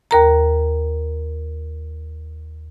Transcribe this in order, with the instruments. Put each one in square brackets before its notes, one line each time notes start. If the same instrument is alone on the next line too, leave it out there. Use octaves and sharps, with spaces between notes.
[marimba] D#2 A#4 A#5